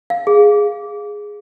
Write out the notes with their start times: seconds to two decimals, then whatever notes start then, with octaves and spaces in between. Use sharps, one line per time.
0.10 F5
0.27 G#4